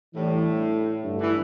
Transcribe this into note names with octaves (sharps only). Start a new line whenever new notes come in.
A2 E3 G3 D4
G2 D3 A3 D4
E3